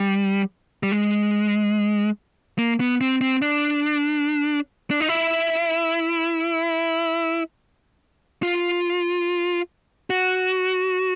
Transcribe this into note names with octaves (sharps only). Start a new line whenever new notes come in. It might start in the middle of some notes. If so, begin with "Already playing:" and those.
Already playing: G3
G3
G#3
A#3
B3
C4
C4
D4
D4
D#4
E4
F4
F#4